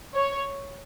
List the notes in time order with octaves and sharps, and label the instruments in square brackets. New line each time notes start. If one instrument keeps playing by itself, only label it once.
[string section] C#5